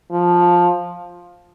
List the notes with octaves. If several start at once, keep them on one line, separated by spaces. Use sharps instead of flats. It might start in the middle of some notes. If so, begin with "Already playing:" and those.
F3